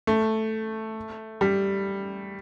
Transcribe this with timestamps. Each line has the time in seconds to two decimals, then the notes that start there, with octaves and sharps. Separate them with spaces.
0.07 A3
1.41 G3